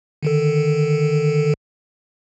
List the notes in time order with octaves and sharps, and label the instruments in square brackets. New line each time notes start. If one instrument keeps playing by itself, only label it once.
[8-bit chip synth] D3 D#3 A4